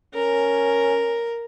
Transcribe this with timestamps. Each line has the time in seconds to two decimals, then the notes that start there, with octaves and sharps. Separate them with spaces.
0.15 C#4 A#4